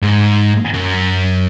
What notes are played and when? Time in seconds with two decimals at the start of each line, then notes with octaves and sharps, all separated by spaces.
0.02 G#2
0.74 F#2